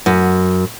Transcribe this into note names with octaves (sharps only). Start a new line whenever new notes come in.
F#2